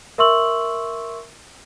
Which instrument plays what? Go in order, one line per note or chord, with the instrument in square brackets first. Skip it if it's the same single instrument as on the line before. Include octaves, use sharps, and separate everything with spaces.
[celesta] A#4 E5 C6 C#6 E6 F#7